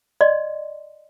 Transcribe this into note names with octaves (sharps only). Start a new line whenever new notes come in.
D5 D#5 C6